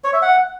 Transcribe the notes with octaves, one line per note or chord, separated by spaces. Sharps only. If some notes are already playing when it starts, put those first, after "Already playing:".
C#5
E5
F#5